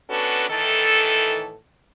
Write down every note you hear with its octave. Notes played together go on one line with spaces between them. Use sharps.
B3 C#4 D4 F#4 A4 B4
A2 D#3 E3 A4